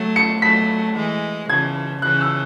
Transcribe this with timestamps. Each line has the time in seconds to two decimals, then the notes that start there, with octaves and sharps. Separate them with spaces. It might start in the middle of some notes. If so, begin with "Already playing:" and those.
Already playing: F#3 A3
0.16 C#7
0.42 F#3 A3 B6
0.96 E3 G#3
1.49 C#3 E3 G#6
2.02 C#3 E3 F#6
2.21 E6